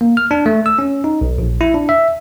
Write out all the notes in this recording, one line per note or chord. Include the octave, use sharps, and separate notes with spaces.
A#3
F6
D4
A3
E6
C#4
D#4
B1
A#1
E4
D4
E5